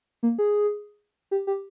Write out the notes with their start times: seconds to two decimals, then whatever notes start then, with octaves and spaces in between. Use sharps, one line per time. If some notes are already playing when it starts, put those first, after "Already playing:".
0.23 A#3
0.39 G#4
1.31 G4
1.47 G4